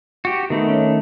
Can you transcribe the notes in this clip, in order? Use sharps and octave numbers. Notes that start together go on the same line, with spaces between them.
F#4 G4
D#3 A3 B3
C#4